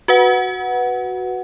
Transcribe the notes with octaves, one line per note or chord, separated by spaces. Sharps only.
F#4 B4 F#5